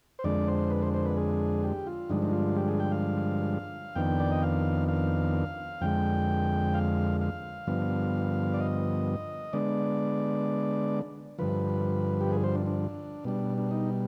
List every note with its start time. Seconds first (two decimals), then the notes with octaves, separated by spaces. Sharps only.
0.19 C5
0.24 F2 D3 G#3 D4 D5
0.48 C5
0.70 B4
0.82 C5
0.94 C5
1.05 B4
1.17 G#4
1.64 G4
1.87 F4
2.09 G2 D3 F3 G#3 D4 D#4
2.22 D#4
2.33 F4
2.56 G4
2.68 G#4
2.80 G5
2.91 F5
3.95 F2 D#3 B3 D4 G5
4.20 D5
4.32 D#5
4.43 F5
4.88 F5
5.81 F2 D3 G#3 G5
6.74 F5
7.21 F5
7.67 G2 D3 F3 B3
8.54 D5
8.60 D#5
9.53 D3 G#3 B3 D4 D5
11.38 G2 D3 F3 B4
12.21 G4
12.32 G#4
12.44 C5
12.55 D4
12.67 D4
13.25 B2 G3 D4
13.58 D4
13.71 D#4